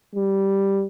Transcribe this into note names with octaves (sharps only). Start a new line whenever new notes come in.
G3